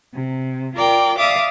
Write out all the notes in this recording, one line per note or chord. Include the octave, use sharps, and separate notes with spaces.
C3
F4 A#4 D5 G5
D5 E5 F5 D6 D#6